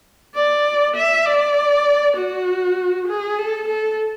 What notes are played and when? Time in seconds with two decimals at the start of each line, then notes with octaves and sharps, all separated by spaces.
0.35 D5
0.96 E5
1.26 D5
2.17 F#4
3.08 G#4
3.38 A4
3.68 A4